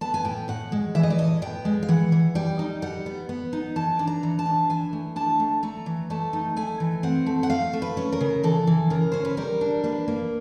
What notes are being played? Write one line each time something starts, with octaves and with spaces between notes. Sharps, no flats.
B3 A5
G#5
A2 G5
A2 F#5
G#3
E3 E5
D#5
D5
A2 D#5
B3 G5
G#3
F5
E3 F#5
E3
G3 G5
D#4
G3 F#5
B3
B3
D#4
E3 A5
D4
A#5
E3
A5
D4
E3 G#5
A3
D4 A5
A3
A3 A#5
E3
A3 A5
D#4
A3 G#5
E3
C4 F#5
A3
F#5
A3 F5
A3
B4
C#4
A#4
C#3
E3 A4
E3
C#3 A#4
C#4 C5
B4
G3 A#4
D4
A#3 B4
A#3